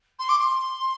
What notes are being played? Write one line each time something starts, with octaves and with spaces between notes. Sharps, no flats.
C6
D6
C6